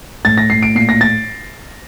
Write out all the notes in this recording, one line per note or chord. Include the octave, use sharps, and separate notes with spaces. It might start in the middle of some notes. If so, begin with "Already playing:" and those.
A2 A6
A#6
A2 C7
D7
A#2 C7
A#6
A6